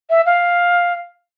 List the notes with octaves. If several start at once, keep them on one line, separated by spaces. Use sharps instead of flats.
E5
F5